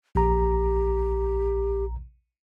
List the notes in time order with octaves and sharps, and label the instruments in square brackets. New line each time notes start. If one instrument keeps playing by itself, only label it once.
[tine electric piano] A#1 A#5 [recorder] G4